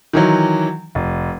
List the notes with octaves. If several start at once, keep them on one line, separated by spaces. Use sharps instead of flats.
D#3 E3 F#3
F1